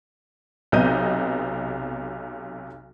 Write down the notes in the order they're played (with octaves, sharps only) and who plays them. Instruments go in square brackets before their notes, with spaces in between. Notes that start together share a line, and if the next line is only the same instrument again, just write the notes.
[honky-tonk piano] B1 C3 B3 D#5 G6 D#7